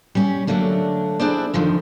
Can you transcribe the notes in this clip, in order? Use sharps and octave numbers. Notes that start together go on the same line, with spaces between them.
G3 C#4
D3 F#3 A3 A#3 D4
D4 E4 G#4 A4 C5 D5
F2 D3 D#3 F3